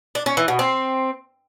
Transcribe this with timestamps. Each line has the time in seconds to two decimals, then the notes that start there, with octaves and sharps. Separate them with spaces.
0.15 D4
0.26 C#4
0.37 E3
0.48 B2
0.59 C4